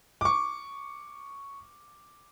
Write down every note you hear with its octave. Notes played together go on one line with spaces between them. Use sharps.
C#6 D6